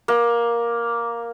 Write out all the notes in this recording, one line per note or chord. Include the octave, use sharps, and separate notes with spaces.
A#3